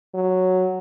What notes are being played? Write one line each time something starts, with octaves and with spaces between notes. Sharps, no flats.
F#3